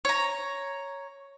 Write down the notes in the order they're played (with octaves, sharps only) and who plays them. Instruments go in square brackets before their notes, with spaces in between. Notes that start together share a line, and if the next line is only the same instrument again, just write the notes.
[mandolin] C#5 A#5